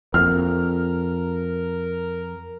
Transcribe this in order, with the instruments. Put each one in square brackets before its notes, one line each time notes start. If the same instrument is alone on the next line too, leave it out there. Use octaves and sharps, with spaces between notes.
[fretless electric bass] F2 [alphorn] A#4 [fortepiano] F6